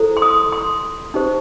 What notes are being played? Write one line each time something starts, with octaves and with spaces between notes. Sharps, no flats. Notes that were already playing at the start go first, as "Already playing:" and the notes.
Already playing: E4 A4 C5
C6
D#6
C6
D#4 G4 C5